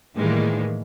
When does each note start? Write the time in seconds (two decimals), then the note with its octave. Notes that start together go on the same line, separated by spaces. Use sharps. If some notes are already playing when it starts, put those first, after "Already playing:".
0.16 A2 D#3 E3 G3 G#3 A#3